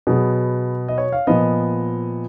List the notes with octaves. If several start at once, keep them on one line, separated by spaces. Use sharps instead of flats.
B2 F#3 B3 G#4
D#5
C#5
F5
A#2 F3 B3 D#5